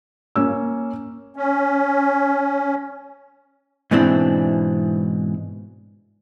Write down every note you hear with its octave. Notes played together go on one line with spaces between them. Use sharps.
A#3 C#4 E6
C#4
G#2 B2 E3 C4 D4